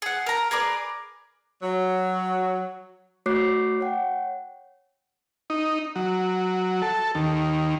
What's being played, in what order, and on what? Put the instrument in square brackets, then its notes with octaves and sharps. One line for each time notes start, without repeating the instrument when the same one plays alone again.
[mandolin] G#4 F#5
A#4 A#5
G#4 A#4 B4 D5
[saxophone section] F#3
[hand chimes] A3 F#4 C#5 D6 F#6 C7
C#5 F#5 G5
[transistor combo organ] D#4
F#3
A4
D#2